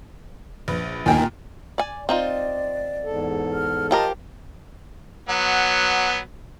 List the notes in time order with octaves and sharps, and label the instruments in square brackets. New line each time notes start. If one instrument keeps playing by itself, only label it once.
[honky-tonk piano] A#1 B4
[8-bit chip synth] D#2 D#3 [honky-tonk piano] A#2 [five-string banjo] A#3 G5 G#5
[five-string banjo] D5 G#5
[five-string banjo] C4 D#4 F4 [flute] D5
[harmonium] E2 G#2 A4
[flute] F6
[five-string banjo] F3 G4 A#4 [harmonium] D#5 [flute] A5
[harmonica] F#3 B3